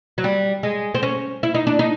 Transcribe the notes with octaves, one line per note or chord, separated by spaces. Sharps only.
F#3
G3
G#3
C4
C#4
E4
D#4
D4
D#4